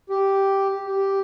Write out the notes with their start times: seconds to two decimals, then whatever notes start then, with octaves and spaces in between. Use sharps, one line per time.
0.10 G4
0.87 G4